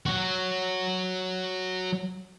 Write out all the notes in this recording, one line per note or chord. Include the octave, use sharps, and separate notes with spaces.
F#3 F#4